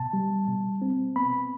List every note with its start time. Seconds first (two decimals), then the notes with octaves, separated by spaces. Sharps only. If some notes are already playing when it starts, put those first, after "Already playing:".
Already playing: B2 A5
0.13 G3
0.48 B2
0.82 C4
1.16 B3 B5